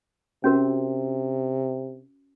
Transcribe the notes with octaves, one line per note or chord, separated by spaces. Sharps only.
C3 C#4 F#4 A#4